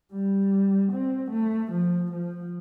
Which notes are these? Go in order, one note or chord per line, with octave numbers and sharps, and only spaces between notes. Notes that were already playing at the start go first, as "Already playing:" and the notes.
G3
C4
A3
F3
F3